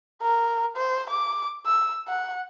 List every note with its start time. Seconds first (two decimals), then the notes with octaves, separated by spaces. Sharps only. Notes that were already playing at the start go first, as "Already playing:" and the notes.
0.22 A#4
0.77 C5
1.10 D6
1.66 E6
2.08 F#5